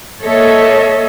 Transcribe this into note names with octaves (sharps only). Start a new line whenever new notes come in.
A#3 A4 C#5 D#5 E5